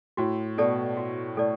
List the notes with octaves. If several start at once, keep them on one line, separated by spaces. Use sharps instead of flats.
A2 F#4
B2 A4 D5 A5
F#4
A2 A4 D5 A5